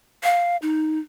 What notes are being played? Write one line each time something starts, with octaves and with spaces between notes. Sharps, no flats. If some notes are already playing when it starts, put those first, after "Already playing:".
F5
D#4